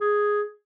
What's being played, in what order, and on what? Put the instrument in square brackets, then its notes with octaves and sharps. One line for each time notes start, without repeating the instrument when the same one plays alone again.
[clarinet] G#4